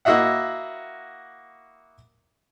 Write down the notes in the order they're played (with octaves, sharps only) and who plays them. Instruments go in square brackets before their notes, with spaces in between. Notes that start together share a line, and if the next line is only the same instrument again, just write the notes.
[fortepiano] A#3 E4 F#4 D#5 E5 F#5